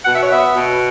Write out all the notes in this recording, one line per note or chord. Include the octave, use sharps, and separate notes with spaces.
B2 F#5
E5
C#5
B3 E5
B2